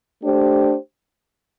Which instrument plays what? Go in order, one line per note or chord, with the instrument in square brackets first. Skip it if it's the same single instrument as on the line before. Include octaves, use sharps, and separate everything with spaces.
[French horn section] A3 D4 G4 C5